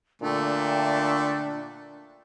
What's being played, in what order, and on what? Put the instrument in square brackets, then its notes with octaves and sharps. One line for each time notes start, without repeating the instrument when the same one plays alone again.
[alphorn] A#2 [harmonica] D3 A3 [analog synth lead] D4 [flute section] E5 G5 A5